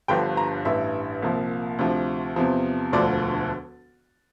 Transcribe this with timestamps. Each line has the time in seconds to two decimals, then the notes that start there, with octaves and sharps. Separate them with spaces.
0.08 G1 G2 D3 F3 G5
0.37 A#5
0.65 A1 G2 E3 E5
1.22 C2 A#2 F3
1.79 D2 C3 F3
2.36 E2 C3 F3
2.92 E1 D2 D3 F3 D5